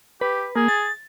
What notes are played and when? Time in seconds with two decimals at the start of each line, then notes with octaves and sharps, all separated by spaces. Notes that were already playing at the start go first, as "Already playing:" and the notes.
0.21 G4 B4
0.56 A#3 G#4
0.68 A6